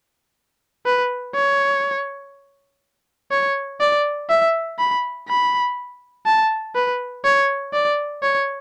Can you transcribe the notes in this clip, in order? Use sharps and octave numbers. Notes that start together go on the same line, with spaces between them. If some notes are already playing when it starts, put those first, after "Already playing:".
B4
C#5
C#5
D5
E5
B5
B5
A5
B4
C#5
D5
C#5